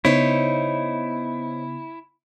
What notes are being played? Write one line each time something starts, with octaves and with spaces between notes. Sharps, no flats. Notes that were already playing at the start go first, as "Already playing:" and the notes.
C#3 B3 D#4 E4 C5 C#5